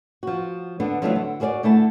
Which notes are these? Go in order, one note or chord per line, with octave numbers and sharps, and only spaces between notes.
F3 F#4
D3 B3 D4
F3 F#3 A3 D4 E4 F4
D3
F#4 G#4 A#4 C#5 D5
D3 A3 E4 A5